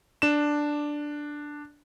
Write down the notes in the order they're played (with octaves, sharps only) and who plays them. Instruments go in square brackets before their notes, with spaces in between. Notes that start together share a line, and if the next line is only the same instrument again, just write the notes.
[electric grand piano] D4 E7